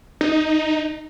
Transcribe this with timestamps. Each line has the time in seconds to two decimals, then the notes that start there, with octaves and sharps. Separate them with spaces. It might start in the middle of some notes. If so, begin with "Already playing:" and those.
0.21 D#4